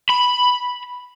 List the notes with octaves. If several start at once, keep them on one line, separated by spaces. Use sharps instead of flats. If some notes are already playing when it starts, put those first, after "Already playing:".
B5